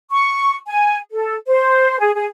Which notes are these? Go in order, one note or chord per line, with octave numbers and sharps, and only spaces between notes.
C#6
G#5
A4
C5
G#4
G#4